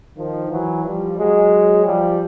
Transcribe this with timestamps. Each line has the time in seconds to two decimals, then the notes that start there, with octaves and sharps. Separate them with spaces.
0.17 D#3 F3
0.50 E3 F#3
0.84 F3 G3
1.17 F#3 G#3
1.85 F3 G3